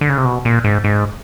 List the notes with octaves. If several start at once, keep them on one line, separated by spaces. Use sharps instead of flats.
D3
C#3
C3
B2
A#2
G#2
G#2